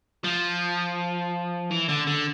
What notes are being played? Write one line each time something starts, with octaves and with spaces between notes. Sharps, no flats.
F3
E3
D3
D3